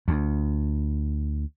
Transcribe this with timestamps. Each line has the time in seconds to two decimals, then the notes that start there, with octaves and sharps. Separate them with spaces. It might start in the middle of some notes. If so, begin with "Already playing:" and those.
0.08 D2